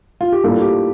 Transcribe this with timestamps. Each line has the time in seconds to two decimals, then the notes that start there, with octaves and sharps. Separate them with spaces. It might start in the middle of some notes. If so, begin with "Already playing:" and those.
0.21 F4
0.32 G4
0.43 A2 G3 A#3 D4 F4 A4
0.61 G4